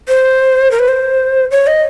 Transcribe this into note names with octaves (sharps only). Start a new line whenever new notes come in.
C5
A#4
B4
C5
C#5
D#5